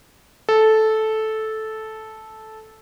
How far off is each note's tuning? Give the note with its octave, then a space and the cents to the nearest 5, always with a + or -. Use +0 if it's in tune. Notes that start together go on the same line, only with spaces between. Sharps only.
A4 -10